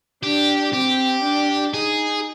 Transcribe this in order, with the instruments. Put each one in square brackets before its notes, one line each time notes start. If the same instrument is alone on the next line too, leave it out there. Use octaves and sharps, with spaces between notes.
[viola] D4 [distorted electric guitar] G4
[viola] C4 [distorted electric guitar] G4
[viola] D4
[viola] D#4 [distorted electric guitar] G#4